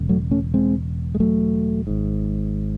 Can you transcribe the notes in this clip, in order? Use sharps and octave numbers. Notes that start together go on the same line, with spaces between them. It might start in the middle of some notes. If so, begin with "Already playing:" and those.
Already playing: E1 C#3
F#3 A3
A3 C#4
G#3 C4
G#3
F#3 A3
G#1 G#2